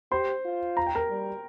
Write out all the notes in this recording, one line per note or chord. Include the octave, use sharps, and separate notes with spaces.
G4 C5 C6
F4
A#5
G5
A#4 A#5
G3